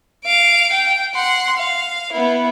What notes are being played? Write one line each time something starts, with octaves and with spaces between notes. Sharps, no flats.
F5 D7
G5
F#5 C6
F5
B3 E4